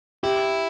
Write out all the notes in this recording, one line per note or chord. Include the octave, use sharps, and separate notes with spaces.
E4 G4